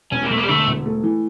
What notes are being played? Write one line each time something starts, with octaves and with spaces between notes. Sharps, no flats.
E1 C#4
A#3
E1 A3
A#3
G3
D3 A3
E1
A3
E3